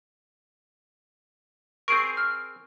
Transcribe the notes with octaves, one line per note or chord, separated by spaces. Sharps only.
C4 G#4 A#4 C#6 D7
F6